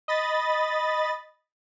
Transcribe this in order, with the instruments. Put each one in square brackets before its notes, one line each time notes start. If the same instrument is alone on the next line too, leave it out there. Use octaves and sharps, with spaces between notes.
[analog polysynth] D#5 B5 A6